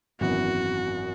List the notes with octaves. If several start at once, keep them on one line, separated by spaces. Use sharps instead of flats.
G#1 F#2 E3 B3 F#4